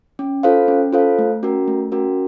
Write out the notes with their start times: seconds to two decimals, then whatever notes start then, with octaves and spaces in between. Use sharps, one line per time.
0.19 C#4
0.43 F4 A4 C5 F5
0.68 C#4
0.93 F4 A4 C5 F5
1.18 A3
1.43 C#4 F#4 A#4
1.68 A3
1.92 C#4 F#4 A#4